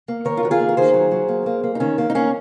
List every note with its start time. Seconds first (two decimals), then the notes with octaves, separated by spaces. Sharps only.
0.08 A#3
0.25 D#3 A#4 C#5
0.37 F4
0.43 D#3 F#4
0.51 F4 G#4
0.60 A#3
0.69 A#4
0.77 D#3 G#4 C5
0.94 F#3
1.11 F#3
1.29 A#3
1.46 A#3
1.64 A#3
1.75 D#4
1.80 D#3 C#4
1.98 A#3
2.10 D#4
2.15 A#3 C#4